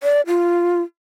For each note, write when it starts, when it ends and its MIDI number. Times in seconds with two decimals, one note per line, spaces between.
0.03 0.21 74
0.27 0.81 65